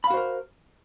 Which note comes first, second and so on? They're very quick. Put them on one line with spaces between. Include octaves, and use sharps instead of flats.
B5 F5 F#4 C5 A#4